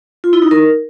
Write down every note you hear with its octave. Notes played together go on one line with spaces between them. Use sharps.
F4
E4
D#4
A#4